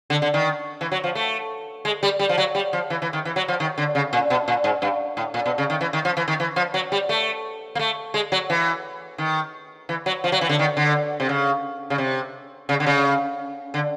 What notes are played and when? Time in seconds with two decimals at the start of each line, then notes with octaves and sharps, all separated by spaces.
0.10 D3
0.22 D3
0.34 D#3
0.81 E3
0.92 F#3
1.04 F3
1.15 A3
1.85 G#3
2.03 G3
2.19 G3
2.29 F3
2.38 F#3
2.55 G3
2.73 F3
2.90 E3
3.02 E3
3.13 D#3
3.25 E3
3.36 F#3
3.48 F3
3.60 D#3
3.78 D3
3.95 C#3
4.13 A#2
4.30 B2
4.48 A#2
4.64 G#2
4.82 G2
5.17 A2
5.34 A#2
5.46 B2
5.58 C#3
5.70 D#3
5.81 E3
5.93 D#3
6.05 F3
6.17 E3
6.28 D#3
6.40 E3
6.56 F3
6.74 F#3
6.92 G3
7.09 A3
7.75 A#3
7.79 A3
8.14 G#3
8.32 F#3
8.50 E3
9.18 D#3
9.89 E3
10.06 F#3
10.24 F3
10.32 F#3
10.41 E3
10.49 D3
10.59 D#3
10.77 D3
11.20 C3
11.29 C#3
11.90 C#3
11.98 C3
12.69 C#3
12.80 D3
12.87 C#3
13.74 D3